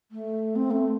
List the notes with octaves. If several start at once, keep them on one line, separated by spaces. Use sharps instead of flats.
A3
C4
A3